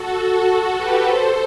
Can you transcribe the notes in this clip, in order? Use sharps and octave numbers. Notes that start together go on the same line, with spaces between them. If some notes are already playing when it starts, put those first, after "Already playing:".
Already playing: F#4 A4
F#4 A4
G4 B4
A4 C5